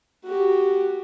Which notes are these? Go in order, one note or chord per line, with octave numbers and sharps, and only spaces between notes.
F#4 G4